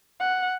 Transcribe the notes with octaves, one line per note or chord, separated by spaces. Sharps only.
F#5